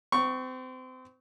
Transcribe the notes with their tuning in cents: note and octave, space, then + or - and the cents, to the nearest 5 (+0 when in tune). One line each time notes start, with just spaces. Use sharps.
C4 -30 C#6 +0